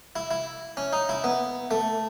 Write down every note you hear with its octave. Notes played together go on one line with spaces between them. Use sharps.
E4
E4
C#4
D#4
E4
B3
A3